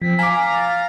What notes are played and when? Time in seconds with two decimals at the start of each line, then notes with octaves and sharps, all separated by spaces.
0.02 F3 C4 B6
0.19 F5 G#5 A#5 D6
0.55 A6